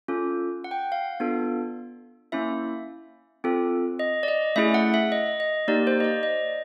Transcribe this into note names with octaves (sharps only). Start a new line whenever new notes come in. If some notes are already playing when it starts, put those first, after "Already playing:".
C#4 F4 A4
F#5
G5
F#5
F5
B3 D4 F4 A4
A#3 C#4 E4 E5
C4 F4 A4
D#5
D5
D#5
A3 C#4 E4 G#4 E5
F#5
E5
D#5
D#5
A#3 D#4 G4 D5
C5
D#5
D5
D#5